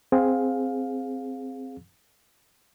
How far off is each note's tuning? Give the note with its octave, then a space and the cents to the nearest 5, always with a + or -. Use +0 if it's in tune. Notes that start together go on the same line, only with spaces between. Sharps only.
C4 +0 G#4 +0 F5 +20